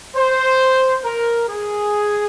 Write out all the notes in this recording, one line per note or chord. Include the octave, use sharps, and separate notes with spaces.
C5
A#4
G#4